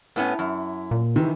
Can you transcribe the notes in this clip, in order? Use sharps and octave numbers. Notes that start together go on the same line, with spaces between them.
A2 B3 C#4 E4
F#2
A#2
C3 D#3 E3